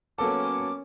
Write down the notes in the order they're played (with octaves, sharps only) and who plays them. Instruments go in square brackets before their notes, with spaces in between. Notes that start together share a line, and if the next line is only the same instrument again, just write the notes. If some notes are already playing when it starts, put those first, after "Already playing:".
[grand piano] F#3 A#3 B3 [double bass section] C#4 [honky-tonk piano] A4 [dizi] D6